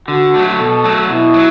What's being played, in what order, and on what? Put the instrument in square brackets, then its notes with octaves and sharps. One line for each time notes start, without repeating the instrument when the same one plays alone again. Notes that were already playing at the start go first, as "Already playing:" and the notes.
[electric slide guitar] D3 [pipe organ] F#4
[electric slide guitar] F#3 A3 D4
[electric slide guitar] B2 [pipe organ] A4
[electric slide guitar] F#3 A3
[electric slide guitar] B2 [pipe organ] E4
[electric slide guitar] F#3